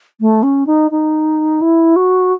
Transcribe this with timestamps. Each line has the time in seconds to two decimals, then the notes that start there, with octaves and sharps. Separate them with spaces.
0.20 A3
0.43 C#4
0.66 D#4
0.91 D#4
1.61 E4
1.96 F#4